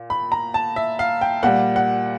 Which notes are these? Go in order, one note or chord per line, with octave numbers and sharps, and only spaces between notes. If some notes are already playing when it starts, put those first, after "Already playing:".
Already playing: A#2
B5
A#5
A5
E5
F5
G5
A#2 G3 F#5
F#5